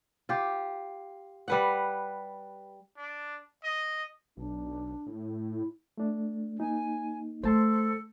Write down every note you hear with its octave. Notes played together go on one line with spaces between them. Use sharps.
F4 G4
G3 B4 F#5
D4
D#5
B1 D4
A2
E4
A3 D4
A#3 D#4 G#5
A3 A4 C5 A5 C6